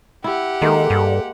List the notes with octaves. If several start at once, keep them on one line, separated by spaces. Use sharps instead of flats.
E4 G4 F#5
D#3 G#3 A#3 A4
G2